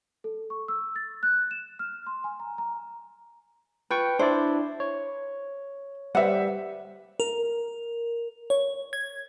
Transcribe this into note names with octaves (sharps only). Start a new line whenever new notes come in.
A4
C#6
E6
A6
F#6
E7
F6
C6
G#5
A#5
A#5
F4 B4 G5 C#6
D4 E4 C5 D5
C#5
G3 B4 C5 E5 F#5
A#4
C#5
G#6